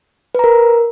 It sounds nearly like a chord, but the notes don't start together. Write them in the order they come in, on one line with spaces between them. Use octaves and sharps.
B4 A#5 A#4